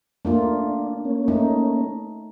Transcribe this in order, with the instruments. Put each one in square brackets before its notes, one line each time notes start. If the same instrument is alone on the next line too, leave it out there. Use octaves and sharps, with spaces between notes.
[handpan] A3 A#3 F4 [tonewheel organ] D4
[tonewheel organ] A#3 C#4
[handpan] A3 D#4